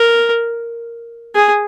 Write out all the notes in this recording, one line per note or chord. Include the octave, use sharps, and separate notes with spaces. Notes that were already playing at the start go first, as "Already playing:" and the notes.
Already playing: A#4
G#4